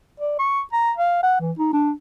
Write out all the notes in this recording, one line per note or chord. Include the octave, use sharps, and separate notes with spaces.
D5
C#6
A#5
F5
F#5
E3
D#4
D4